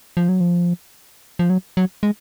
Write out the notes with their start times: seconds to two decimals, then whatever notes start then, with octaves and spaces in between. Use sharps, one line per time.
0.17 F3
0.29 F#3
0.41 F3
1.39 F3
1.50 F#3
1.77 F#3
2.03 G#3